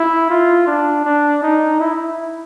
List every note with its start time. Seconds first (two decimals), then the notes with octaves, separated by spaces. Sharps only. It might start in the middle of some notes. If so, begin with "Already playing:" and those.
Already playing: E4
0.30 F4
0.67 D4
1.05 D4
1.43 D#4
1.80 E4